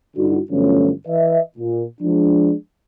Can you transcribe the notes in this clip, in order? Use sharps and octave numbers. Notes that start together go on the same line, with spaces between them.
G2 D3 D#4 E4 F#4
G1 F3 F#3 A3 C#4
E3 B4 D#5 E5
A#2
F3 G#3 D4